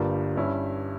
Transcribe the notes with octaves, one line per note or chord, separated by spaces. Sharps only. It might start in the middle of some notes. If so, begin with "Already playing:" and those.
Already playing: G1 G2 G3 A#3 F4
G2 G3 C#4 E4